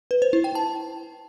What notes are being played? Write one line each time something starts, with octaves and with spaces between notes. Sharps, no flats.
B4
C5
E4
G5
A5